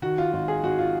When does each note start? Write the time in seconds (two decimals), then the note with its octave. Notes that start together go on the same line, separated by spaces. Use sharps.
0.02 D#3 F#4
0.18 F4
0.33 G#1 F4
0.48 G#4
0.63 G#1 F#4
0.79 F4